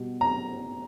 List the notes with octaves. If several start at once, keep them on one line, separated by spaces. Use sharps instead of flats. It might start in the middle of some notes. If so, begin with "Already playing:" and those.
Already playing: B2 G3
A#5